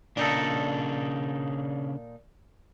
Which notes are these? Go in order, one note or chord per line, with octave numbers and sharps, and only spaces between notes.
A#2 C#3 D4 D#4 A4